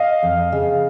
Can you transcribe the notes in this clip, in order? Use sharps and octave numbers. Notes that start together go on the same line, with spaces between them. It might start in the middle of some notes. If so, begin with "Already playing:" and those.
Already playing: D#5 F5
F2
C#3